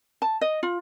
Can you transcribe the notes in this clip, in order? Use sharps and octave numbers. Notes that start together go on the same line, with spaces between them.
A5
D#5
F4